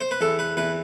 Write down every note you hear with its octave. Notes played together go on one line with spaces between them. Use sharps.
C5
B4
E2 A4
B4
E2 B4